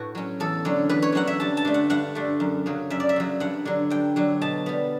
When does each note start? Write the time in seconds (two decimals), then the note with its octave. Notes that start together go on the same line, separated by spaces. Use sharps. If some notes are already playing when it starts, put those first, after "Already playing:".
Already playing: A2 F#4 B4
0.15 F#3 C#4
0.40 E2 A4
0.65 D3 F#3 C#4
0.89 E2 B4
1.02 C#5
1.12 D3 F#3 C#4 F#5
1.27 E5
1.40 G2 A5
1.57 A5
1.65 D3 A3
1.74 F#5
1.90 G2 F#5
2.15 D3 A3
2.40 F#2
2.66 C#3 F#3
2.90 F#2 E5
3.00 D5
3.09 E5
3.16 C#3 F#3
3.40 G2 F#5
3.65 D3 F#3
3.90 G2 G5
4.16 D3 F#3
4.41 B2 A5
4.66 G3 B3